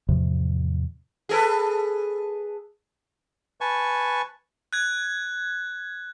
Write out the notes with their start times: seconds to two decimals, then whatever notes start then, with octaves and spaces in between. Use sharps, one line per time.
0.09 E2 A2 C3 F3
1.29 G#4 A4 B4
3.61 B4 G#5 A5 C#6
4.73 F#6 G#6